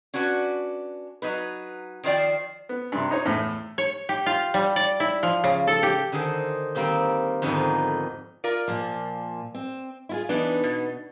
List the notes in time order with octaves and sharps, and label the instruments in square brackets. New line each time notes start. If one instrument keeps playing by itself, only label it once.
[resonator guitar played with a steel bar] C#4 D4 F#4 B4
F#3 D#4 B4
D#3 F3 C5 D5 G5
[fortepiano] B3
G2 C3
D#4 C5 C#5
E2 A2
[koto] C#5
G4
F4
G3
D5
E4
F3
C#3
A4
G4
[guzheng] D3 D#3 G#4 A4 C5
D#3 G3 A#3 C4 G4
F2 G#2 D3 D#3 B3 D#4
[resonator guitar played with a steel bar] F4 A#4 D5
[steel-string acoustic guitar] A#2 F3
C4
E4 F4 G#4
[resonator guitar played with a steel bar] E3 D4 [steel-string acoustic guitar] B3 D#4
[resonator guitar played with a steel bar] B2